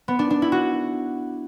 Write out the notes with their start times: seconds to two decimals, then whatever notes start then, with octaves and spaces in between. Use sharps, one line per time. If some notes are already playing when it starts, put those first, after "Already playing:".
0.08 B3
0.19 D4
0.30 D4
0.42 E4
0.52 F#4